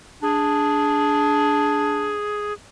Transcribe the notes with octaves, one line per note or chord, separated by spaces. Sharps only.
D4 G#4